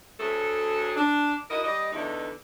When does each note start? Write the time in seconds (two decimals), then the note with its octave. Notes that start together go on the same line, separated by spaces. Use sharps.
0.19 D2 F#3 G#4 A4
0.96 D4
1.49 E4 F#4 A#4 D#5
1.64 G3 D5 D#5
1.92 E2 D3 E3 A3 D#4